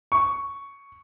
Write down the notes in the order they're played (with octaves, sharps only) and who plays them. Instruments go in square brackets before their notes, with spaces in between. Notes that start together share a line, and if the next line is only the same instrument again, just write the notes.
[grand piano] C#6